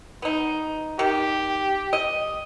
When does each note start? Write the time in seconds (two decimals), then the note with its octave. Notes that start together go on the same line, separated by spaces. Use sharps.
0.22 B3 D#4
0.99 D#3 G4
1.93 D#5